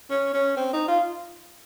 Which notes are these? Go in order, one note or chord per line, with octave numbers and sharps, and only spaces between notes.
C#4
C#4
C4
D#4
F4